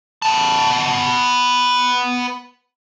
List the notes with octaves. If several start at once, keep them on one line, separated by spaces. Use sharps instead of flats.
B3 A5